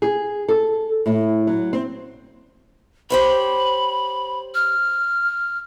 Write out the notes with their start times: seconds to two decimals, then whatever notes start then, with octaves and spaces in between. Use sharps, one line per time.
0.02 G#4
0.48 A4
1.06 A2
1.47 F#3
1.73 C4
3.10 G4 C5 C#5 B5
4.55 F6